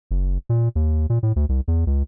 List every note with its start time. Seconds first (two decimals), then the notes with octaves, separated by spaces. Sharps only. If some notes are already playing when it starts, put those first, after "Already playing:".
0.11 F#1
0.49 A#2
0.76 D#2
1.10 A#2
1.23 A2
1.36 D2
1.49 C2
1.68 E2
1.87 C#2